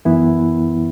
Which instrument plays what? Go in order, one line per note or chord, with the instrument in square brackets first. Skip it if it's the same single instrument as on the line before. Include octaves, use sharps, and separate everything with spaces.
[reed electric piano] F#2 E3 B3 E4